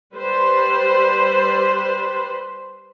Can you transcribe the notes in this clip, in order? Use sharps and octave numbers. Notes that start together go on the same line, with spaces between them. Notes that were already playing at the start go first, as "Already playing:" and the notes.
G3 B4 C5